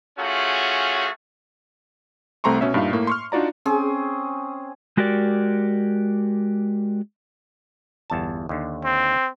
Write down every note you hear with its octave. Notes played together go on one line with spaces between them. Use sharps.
A3 C#4 F4 F#4 G#4
C2 A3 C4 A#5 C6 C#6
B2 C#4 E5
G2 A#2 D#4 E5 F5
A2 A#3
C6 C#6 F6
D4 D#4 F4 F#4 D5 A#5
C4 C#4 G#4
G#3 F#4 G4 A#4 D5
G1 E2 A5
D#2 D3
C4